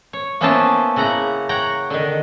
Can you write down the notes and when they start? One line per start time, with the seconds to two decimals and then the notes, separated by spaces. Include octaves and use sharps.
0.13 C#5
0.41 A#3 B3 C#4 E4 C5 A5
0.96 C#3 E4 F#5 A#5
1.49 C#5 F#5 G5 A#5
1.90 D3 D#3